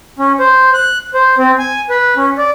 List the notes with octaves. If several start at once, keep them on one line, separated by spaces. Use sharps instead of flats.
C#4
C5
F#6
C5
C4
G#5
B4
C#4
D5